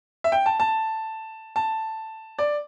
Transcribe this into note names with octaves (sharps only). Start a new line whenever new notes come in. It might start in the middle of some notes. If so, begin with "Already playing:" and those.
E5
G5
A5
A5
A5
D5